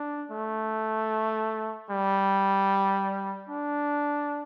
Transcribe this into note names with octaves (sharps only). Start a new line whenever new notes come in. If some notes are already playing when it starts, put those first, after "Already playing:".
Already playing: D4
A3
G3
D4